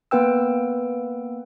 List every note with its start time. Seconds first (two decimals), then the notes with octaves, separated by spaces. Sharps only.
0.11 A#3 B3 B4 G5 E6